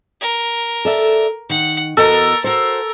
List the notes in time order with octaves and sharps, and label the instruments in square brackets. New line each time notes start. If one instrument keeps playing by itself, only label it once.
[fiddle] A#4
[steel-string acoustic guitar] A4 D5 E5
[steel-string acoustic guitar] D#3 [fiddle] F#5
[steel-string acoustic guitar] E2 F#4 D#5 [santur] A4 [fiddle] A#4
[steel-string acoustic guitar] F#4 C5 [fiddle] A#4